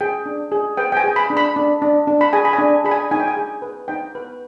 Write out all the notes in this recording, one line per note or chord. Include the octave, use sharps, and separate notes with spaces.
G#4 G5
D4
G#4
B4 G5
G5
G#5
G#4
B5
D4
B5
D4
D4
D4
B5
G#4 G#5
B5
G#5
D4
G#4 B5
G#5
D#4 G#5
G5
G#5
G#4
B4
D#4 G5
B4